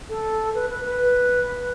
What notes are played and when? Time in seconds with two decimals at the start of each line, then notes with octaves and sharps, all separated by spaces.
0.09 A4
0.55 B4
0.70 B4
0.85 B4